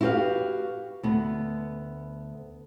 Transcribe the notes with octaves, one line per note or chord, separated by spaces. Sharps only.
E4 F#4 G4 B4 F5
D2 B3